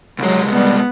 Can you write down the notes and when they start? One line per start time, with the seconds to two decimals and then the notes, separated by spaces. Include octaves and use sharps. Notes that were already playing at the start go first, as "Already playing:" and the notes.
0.19 C2 F#3 G#3
0.52 G3 B3